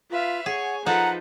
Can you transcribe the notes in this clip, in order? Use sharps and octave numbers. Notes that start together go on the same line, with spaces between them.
F4 B4 E5 F5
G#4 C#5 F#5 G#5
F3 D#4 A4 B4 F#5 A#5